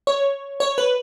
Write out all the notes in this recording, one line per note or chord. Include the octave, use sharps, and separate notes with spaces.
C#5
C#5
B4